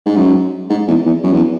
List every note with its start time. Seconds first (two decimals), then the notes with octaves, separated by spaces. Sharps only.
0.06 G#2
0.16 F#2
0.70 G#2
0.88 E2
1.06 E2
1.24 F#2
1.32 E2